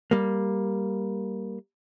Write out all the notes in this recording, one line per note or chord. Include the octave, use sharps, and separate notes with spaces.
G3 A#3